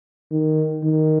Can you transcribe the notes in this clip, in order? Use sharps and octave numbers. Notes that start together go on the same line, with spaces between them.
D#3
D#3